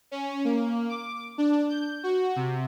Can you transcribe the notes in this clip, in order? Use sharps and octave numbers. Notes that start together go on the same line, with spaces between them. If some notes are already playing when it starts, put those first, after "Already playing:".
C#4
A#3
D6
D4
G6
F#4
C3